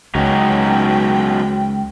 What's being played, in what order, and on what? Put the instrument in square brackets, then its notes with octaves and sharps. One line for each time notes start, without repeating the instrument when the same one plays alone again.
[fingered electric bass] C#2 [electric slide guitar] F#3 C#4 D#4 [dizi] G5